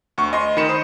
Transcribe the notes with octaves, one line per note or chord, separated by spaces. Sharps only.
D2 C#6
D2 D#5 C6
D#3 D#4 B5 C#7 E7
C5 D#6